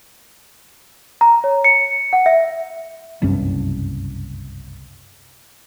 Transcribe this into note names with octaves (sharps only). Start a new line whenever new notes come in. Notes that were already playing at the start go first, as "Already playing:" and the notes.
A#5
C#5
C#7
F#5
E5
F#1 C2 G2 C#4